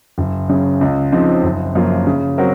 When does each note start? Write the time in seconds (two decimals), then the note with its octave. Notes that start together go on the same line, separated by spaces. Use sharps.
0.18 F#1
0.49 F#2 C#3
0.81 C#2
1.12 C#3 F3 C4 D#4
1.43 F#1
1.75 F#2 F3 A#3 F4
2.07 C#3
2.38 F#3 C4 F#4 A#4